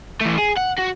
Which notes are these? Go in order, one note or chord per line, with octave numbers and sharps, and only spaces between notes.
E3 A3
G#4
F#5
F#4